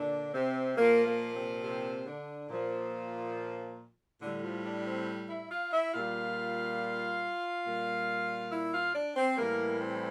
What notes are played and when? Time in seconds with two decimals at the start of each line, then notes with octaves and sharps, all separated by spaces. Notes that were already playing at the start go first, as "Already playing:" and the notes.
Already playing: A#2 D3 D4
0.34 C3 C4
0.77 A#2 F3 A#3
1.07 A#3
1.34 C3 C4
1.63 C3 C4
2.06 D3 D4
2.49 A#2 F3
4.21 A2 D3 G3 D4
4.42 F3 F4
4.64 D4 D5
4.86 C4 C5
5.29 E4 E5
5.50 F4 F5
5.72 E4 E5
5.93 A#2 G3 F4 F5
7.66 A#2 G3
8.51 E4 E5
8.73 F4 F5
8.94 D4 D5
9.16 C4 C5
9.37 A2 E3 G3 A#3 A#4
9.81 C4 C5